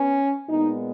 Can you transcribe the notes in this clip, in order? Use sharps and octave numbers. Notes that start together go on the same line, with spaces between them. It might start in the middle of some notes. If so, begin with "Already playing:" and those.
Already playing: B3 C#4
A#2 G#3 B3 D#4